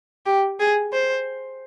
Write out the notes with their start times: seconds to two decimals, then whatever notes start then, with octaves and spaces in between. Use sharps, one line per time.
0.26 G4
0.60 G#4
0.93 C5